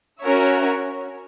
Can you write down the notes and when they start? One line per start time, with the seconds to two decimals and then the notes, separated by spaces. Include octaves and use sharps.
0.21 C#4 F#4 A#4 C#5 E5